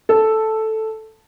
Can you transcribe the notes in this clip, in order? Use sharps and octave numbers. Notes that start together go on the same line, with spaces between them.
A4